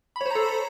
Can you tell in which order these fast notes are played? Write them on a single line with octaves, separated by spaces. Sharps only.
B5 C#5 C5 A#5 A4